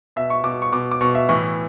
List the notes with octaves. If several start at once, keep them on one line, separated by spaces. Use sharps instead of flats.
B2 E5
C#6
B2 D6
C#6
B2 D6
D6
B2 C#6
E5
A2 E3 C#6